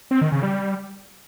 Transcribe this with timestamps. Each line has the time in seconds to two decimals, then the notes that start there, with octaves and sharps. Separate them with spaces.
0.11 C4
0.21 D#3
0.32 C#3
0.43 G3